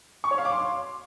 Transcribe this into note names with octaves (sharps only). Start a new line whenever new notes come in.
C#6
C#5
F5
D6
C6